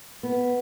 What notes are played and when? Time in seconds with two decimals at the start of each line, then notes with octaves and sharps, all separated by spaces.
0.23 B3